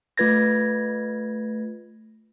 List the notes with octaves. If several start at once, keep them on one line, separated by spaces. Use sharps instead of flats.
A3 F4 B4 G#6 A#6